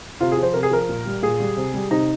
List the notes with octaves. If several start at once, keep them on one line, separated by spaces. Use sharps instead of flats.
C3 F4
G#4
F3
C5
C3 A#4
G#4
F3 A#4
A#2
G3
A#2 G#4
G3
C3
G3
C3 D#4